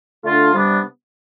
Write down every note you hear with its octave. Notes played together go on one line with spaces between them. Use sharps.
D3 A3 D4 F4
C3 G3 B3 D4